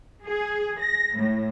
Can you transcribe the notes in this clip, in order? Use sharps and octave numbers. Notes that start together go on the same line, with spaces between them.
G#4
A#6
A2